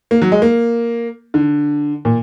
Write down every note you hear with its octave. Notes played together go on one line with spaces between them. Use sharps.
A#3
F#3
G#3
A#3
D3
A#2